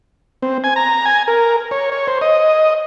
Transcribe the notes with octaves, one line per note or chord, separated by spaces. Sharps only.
C4
G#5
A#5
G#5
A#4
C#5
C#5
C5
D#5